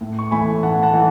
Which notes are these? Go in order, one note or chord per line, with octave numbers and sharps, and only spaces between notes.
A2
C#6
E3 A3 G#5 B5
A2 F#5 A5
F#5 A5
E3